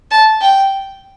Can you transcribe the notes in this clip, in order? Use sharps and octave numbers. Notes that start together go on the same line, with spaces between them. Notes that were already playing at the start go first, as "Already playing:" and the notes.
A5
G5